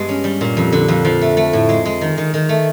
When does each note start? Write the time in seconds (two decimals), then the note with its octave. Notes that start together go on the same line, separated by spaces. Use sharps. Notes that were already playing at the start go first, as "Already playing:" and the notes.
Already playing: G2 G#3 B3
0.09 C#4
0.24 G3
0.41 A#2
0.57 F2
0.72 D3
0.88 F2
1.05 F3
1.21 A3
1.37 A3
1.53 A2
1.69 G#3
1.85 G#3
2.01 D#3
2.18 D#3
2.34 D#3
2.49 A3